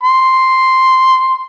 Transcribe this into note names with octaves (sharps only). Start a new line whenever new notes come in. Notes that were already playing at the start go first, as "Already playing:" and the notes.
C6